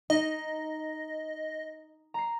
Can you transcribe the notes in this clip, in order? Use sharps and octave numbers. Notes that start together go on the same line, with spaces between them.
D#4 D#5
A#5 C7